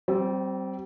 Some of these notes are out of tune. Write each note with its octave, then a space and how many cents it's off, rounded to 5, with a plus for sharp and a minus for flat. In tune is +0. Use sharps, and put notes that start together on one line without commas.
G3 -30 C4 +0